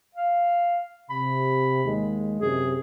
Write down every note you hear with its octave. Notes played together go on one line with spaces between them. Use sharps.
F5
C3 B5
D#2 G#3
F#2 C3 G#4